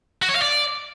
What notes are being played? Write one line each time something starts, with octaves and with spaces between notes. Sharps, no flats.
F#4
C#5
F5
D5